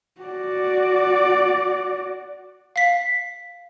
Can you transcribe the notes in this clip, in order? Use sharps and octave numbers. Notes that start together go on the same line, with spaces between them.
F#4 D5
F5 B6